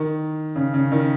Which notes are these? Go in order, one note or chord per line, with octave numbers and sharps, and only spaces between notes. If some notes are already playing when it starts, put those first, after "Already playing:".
Already playing: D#3
C#3
C#3
D#3